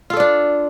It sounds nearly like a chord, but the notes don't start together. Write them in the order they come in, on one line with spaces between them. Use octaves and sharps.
F4 A4 D5 D4